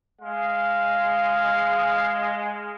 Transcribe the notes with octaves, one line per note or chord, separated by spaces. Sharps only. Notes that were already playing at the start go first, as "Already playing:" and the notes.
G#3 F5